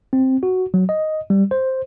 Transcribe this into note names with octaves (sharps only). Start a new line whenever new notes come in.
C4
F#4
F#3
D#5
G3
C5